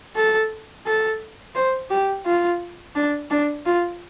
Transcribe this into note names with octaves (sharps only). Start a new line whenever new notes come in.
A4
A4
C5
G4
F4
D4
D4
F4